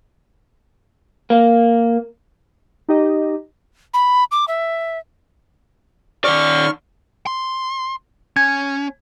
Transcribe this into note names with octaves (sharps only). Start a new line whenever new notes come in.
A#3
D#4 G4 D#5
B5
D6
E5
D#3 D5 C#6 F6
C6
C#4 G#6